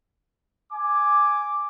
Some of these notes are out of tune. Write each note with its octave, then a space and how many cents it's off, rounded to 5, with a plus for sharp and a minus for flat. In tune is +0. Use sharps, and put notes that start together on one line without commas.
G#5 +0 D6 +0